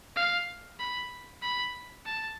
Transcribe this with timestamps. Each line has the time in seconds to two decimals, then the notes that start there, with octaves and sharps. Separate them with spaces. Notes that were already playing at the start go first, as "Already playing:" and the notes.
0.16 F5
0.79 B5
1.42 B5
2.06 A5